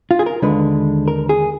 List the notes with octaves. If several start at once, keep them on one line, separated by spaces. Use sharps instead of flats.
F4
G#4
A#4
D#2 D3 G#3 B4
A#4
G#4